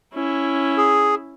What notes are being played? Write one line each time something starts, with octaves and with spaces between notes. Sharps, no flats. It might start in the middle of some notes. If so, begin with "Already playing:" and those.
C#4 E4
G#4